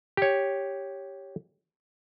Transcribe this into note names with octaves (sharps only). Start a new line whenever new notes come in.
G4 C#5